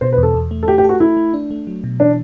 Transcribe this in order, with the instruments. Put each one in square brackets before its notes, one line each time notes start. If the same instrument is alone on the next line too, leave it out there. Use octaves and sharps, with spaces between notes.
[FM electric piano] B2 [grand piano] C5
[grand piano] B4
[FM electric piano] E2
[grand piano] A4
[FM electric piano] E2
A3
[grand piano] A4
[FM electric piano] A3 [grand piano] G4
[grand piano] G4
[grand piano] F#4 [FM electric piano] A4
[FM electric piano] A3 [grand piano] E4
[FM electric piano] A3
D4
A3
F#3
B2
[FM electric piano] E3 [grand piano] D4